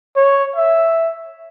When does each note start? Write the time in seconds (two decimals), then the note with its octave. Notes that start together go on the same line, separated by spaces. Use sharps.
0.16 C#5
0.56 E5